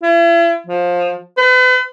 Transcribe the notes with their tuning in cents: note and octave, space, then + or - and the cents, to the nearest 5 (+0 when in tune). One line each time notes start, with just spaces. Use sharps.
E4 +40
F3 +15
B4 +40